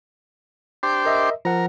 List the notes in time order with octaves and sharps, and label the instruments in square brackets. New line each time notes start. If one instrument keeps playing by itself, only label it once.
[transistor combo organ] D4 G4 C5
[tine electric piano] A#4 D#5 E5
[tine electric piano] F3 F#5 [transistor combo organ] A#4